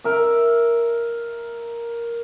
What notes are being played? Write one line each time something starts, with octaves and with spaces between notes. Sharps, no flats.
A#4 E5